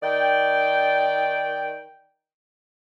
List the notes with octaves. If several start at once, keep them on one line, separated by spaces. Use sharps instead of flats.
D#3 D5 G5